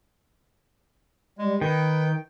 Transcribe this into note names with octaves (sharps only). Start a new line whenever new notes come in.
G3 G#3
D#3 B4 G5